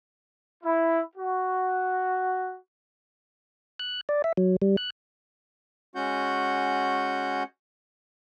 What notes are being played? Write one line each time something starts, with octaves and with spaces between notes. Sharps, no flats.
E4
F#4
F#6
D5
E5
F#3
G3
F#6
G#3 C#4 F#4 F#5 G6